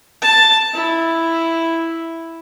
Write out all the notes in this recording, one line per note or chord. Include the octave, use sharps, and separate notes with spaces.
A5
E4